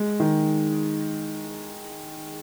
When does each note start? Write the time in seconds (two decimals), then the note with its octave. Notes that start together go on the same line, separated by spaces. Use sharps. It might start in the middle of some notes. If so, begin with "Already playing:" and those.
Already playing: G#3
0.20 D#3